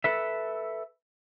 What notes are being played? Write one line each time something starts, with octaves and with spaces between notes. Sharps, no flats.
A4 B4 E5